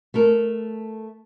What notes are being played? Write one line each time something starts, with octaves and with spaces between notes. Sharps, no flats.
A3 A4 A#4